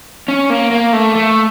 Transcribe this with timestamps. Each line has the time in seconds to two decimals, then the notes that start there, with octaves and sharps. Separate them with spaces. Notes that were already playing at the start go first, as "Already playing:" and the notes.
0.28 C#4
0.50 A#3
0.71 A#3
0.93 A3
1.15 A3